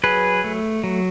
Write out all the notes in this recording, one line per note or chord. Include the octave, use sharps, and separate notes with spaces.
F#3 G#4 B4
A3
F#3